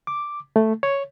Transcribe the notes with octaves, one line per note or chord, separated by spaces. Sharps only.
D6
A3
C#5